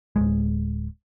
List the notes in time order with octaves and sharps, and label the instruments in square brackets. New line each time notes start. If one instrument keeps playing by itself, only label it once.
[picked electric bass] D1 D#2 G#3